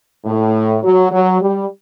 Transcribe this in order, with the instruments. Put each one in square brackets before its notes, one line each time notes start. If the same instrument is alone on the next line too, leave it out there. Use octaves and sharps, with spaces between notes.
[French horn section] A2
F#3
F#3
G3